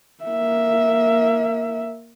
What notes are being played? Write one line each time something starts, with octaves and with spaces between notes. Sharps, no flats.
A#3 E5